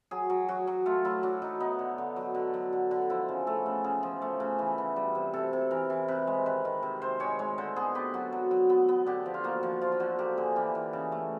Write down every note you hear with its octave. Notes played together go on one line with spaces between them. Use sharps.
F#3 G#4
F#3
F#3 F#4
F#3
A3 F4
F#3 E4
F#3 D4
F#3 D#4
B3 D#4
D3
D3
F#3
D3
F#3
D3
D3
F3 E4
C#3
A3 A4
C#3
C#3 G#4
F3
A3
C#3
E3
E3
G3
C3
C3 A4
C3
E3 A#4
E3
C3 B4
G#3
D#3 B4
D#3
C3
C3 C5
G#3 C#5
G#3 C#5
D3 C5
B3 G#4
B3 G4
F#3 F#4
F#3
F#3
B3
B3
D3 G4
F3
F4
A#3 F#4
F3
F3 F4
F4
D3 F#4
A#3 G4
D3 G#4
E3 G4
E3
C#3
A3